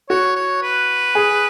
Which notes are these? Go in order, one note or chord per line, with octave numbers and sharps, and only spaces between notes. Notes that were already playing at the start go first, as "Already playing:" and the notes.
F#4 C#5
C#5
B4
G#4